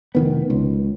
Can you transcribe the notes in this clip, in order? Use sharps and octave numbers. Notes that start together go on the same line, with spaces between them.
F1 D#3 B3
C#2